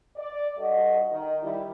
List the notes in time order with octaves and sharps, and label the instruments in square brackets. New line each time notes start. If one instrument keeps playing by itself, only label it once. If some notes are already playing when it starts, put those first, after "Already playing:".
[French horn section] D5
G2 F#4 A4 D#5
D#3 D#5
D#3 G3 E4